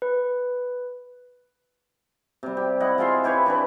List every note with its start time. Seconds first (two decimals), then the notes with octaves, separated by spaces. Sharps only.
0.02 B4
2.43 C3 G3
2.57 G4
2.80 E4 D#5 F#5
2.98 G#3 F4 E5 C6
3.24 E4 G4 B4 C#5
3.46 E3 D4 B4